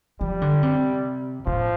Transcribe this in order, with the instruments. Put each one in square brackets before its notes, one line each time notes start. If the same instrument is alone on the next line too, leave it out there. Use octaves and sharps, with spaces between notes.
[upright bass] F3 [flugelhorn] G3
[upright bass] D3
C3
[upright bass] A2 [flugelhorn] F3